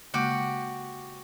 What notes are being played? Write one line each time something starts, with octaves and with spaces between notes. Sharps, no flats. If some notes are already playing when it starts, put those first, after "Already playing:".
C#3 G#3 A#3 F#4 G4